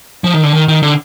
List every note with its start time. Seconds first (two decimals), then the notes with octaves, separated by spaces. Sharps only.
0.24 F3
0.34 D#3
0.44 D3
0.53 D#3
0.68 D#3
0.83 D3